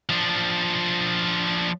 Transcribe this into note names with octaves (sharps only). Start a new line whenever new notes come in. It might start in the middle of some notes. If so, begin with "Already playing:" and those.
F3 D4